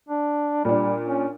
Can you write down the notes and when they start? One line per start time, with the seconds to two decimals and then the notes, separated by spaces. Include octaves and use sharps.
0.09 D4
0.65 A#2 G3 D4
1.05 C#4